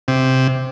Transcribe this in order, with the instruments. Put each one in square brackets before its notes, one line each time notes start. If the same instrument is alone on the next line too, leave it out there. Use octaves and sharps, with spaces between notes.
[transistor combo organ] C3